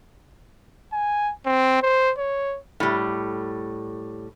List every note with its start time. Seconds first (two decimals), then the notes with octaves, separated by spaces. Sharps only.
0.93 G#5
1.45 C4
1.82 C5
2.18 C#5
2.80 A2 G3